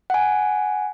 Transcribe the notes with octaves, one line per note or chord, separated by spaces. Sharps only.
F#5 G#5